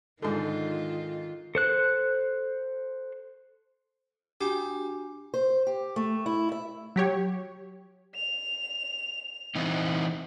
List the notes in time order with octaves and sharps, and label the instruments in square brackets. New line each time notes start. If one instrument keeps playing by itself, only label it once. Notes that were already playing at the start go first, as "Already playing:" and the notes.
[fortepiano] G#2 D3 [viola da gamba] D#3 F4
[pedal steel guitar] A4 C5 F#6
[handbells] D4 F#4 G#5 [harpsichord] G4
[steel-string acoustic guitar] C5
G4
A3
E4
E5
[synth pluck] F#3 G4 C#5
[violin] F7
[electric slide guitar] E3 C4 D#4